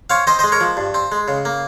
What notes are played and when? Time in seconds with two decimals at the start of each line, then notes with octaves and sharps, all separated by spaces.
0.10 C4 C#5 F5
0.27 C4 C5 D#5
0.39 G#3 C5 D#5
0.52 A#4 C#5
0.60 F3
0.77 G2
0.94 C4
1.12 G#3
1.28 C#3
1.45 A#3